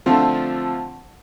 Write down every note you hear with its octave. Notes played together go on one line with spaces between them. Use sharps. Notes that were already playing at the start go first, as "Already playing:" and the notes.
D3 F3 A3 C4 F4